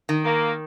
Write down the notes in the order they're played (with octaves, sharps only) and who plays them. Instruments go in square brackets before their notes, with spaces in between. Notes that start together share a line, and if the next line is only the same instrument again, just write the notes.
[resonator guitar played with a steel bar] D#3
[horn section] A#3